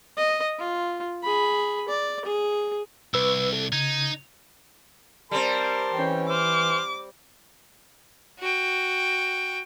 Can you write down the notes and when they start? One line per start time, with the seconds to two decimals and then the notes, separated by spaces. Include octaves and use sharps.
0.17 D#5
0.59 F4
1.23 G#4 B5
1.89 D5
2.25 G#4
3.14 C2 B4 E6
3.53 A4
3.72 C#3 D#4 G#6
5.31 G3 C4 A#4 A5 C6
5.94 E3 C#4 G5
6.29 C5 D6 F6
8.39 F#4 G5